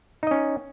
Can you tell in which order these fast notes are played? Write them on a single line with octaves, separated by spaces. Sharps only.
D#4 D#5 C#4